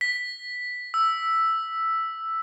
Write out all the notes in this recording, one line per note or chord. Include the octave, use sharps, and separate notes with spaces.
B6
E6